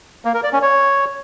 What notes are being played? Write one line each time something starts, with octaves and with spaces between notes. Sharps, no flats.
A#3
A#4
D5
C#4
C#5